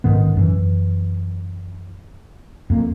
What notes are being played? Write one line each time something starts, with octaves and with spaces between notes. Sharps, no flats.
A1 G#2 D#3 B3
F#2 E3
F2 A#3